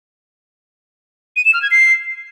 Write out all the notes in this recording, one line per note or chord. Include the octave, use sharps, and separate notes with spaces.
D#7
E7
F6
G#6
C7